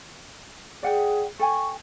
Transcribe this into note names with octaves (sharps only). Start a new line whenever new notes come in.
G#4 D5 F#5 G5
A4 G5 G#5 C#6